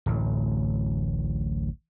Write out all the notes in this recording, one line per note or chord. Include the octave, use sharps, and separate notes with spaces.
D1 A1